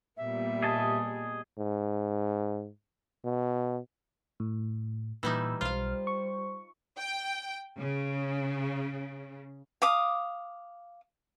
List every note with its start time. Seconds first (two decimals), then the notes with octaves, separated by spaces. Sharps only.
0.17 A#2 G3 B3 E5
0.62 G#4 D#5 A5
1.58 G#2
3.24 B2
4.40 A2
5.23 A#2 E3 G3 D#4 E6
5.61 B1 G3 F4 C5 F5 F6
6.07 C#6
6.97 G5
7.79 C#3
9.82 F5 D6 D#6